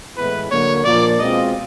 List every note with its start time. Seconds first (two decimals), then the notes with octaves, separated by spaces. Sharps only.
0.16 A2 E3 G#3 B3 E4 B4
0.51 D3 F#3 A#3 C#5
0.84 A#2 F3 A#3 D4 F4 D5
1.19 B2 G#3 C4 F4 D#5